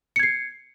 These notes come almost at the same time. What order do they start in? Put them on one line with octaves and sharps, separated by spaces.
C#7 G#6 C7